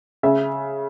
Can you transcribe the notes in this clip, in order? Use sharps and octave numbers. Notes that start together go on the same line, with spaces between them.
C#3 E5